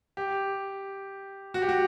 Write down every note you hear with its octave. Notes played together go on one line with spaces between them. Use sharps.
G4
F#4
G4
F#4